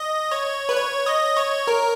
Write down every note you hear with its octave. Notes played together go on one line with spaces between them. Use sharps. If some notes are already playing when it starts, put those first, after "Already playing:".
Already playing: D#5
C#5
B4
C#5
D#5
C#5
A#4